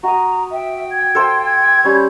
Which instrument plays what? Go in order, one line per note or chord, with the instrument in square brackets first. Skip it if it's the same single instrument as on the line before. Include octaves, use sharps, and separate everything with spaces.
[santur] F#4 D#6 [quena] A#5
[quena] E5 [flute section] G5
[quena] G#6
[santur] A4 C5 F5
[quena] G#6
[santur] G3 C#4 [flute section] C#5 B5 G6